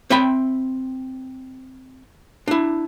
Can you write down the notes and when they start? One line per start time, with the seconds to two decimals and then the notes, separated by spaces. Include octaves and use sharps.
0.10 C4 E5 G5 B5
2.48 D4 E4